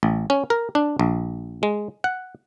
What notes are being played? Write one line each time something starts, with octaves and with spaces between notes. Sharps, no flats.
A1
C#4
A#4
D4
A#1
G#3
F#5